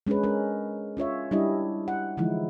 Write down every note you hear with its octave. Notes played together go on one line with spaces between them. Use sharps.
G#3 C#4 D4 G#4 B4
G#3 C#4 A#4
C#4 F4 C#5 E5
G3 D4 E4 G4 D#5
F#5
D3 E3 F3 G#3 D#4 E4